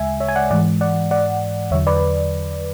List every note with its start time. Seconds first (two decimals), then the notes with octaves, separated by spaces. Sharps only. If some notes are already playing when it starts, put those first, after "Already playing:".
Already playing: D2 C#3 G#3 E5 G#5
0.20 C#5 E5
0.28 G#5
0.36 D5 F#5
0.51 G#2 E3 G#3 D5 F#5
0.81 D5 F#5
1.11 D5 F#5
1.71 E2 D3 F#3 C#5 E5
1.87 B4 D5